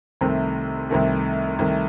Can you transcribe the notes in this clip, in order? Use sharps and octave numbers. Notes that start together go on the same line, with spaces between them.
C2 C3 D#3 A3
C2 C3 D#3 A3
C2 C3 D#3 A3